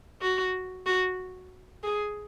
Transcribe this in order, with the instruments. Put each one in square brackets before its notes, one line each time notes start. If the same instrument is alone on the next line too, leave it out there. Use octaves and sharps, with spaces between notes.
[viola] F#4
F#4
G#4